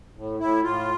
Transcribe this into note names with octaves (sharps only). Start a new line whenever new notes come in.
A2
A2 E4
A2 F4